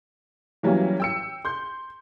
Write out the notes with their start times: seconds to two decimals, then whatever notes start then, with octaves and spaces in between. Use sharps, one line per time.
0.63 E3 F#3 G3 A#3 C#4
1.00 G5 E6 C#7
1.45 C6 G6